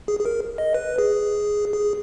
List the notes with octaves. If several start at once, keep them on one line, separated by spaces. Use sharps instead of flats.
G#4
G#4
A#4
D#5
B4
G#4
G#4